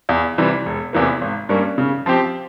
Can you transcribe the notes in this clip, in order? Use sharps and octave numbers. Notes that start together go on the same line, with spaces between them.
E2
C3 E3 G3
E1
E2 C3 E3 A#3
G#1
G2 G3 A#3 C#4
C#3
F3 C4 G4